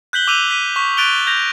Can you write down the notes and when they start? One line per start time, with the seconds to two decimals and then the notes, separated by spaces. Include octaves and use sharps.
0.13 F#6 G6 B6 F#7 G7
0.27 D6 E6 D#7 F7 F#7
0.51 B6 D#7
0.76 C#6 B6
0.97 F#6 A6 D7 D#7 F7 G7
1.27 G6 A#6 F7